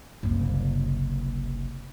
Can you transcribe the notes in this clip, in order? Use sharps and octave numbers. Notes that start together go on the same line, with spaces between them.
F#1 C2